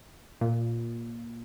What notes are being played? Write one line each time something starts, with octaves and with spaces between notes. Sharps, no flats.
A#2